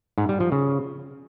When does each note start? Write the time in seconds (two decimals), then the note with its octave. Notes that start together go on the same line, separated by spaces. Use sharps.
0.18 G#2
0.29 G3
0.40 F3
0.52 C#3